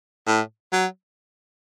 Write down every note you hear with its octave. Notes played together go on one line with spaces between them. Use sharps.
A2
F#3